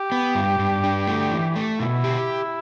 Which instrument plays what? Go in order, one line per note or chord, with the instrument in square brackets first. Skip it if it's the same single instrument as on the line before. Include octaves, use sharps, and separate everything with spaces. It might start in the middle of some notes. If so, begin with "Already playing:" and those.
Already playing: [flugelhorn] G4
[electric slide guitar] B3
G2
G2
D4
A3
E3
A3
[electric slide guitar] B2 [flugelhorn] E4
[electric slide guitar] G4